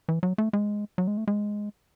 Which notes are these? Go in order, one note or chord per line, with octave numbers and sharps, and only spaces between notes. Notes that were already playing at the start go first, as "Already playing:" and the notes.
E3
F#3
A3
G#3
F#3
G#3
A3
G#3